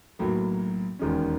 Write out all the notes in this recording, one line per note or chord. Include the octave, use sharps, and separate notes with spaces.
B1 A2 F#3 A#3
E1 D#2 D#3 G#3 C#4